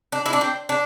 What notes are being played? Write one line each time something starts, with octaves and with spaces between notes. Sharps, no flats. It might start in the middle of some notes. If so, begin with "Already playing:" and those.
D4
E4
D4
C4
D4